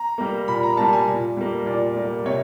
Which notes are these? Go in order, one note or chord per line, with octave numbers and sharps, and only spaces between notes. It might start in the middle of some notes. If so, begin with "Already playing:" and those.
Already playing: A#5
G3 A#3
A#2 B5
A#5
G3 A#3 A5
G#5
A#2
G3 A#3
A#2 D5
G3 A#3
C3 C#5